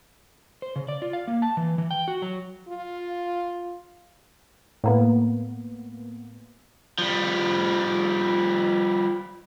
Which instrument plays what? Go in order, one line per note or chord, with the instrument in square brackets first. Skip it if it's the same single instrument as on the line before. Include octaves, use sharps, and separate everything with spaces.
[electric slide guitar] C5
C#3
D5
F4
F5
A#3
A5
E3
E3
G5
F#4
F#3
[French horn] F4
[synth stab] A2 A#3 B3
[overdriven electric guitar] F3 G3